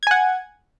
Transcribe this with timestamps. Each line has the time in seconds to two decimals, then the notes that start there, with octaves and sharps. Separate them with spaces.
0.03 G#6
0.07 G#5
0.11 F#5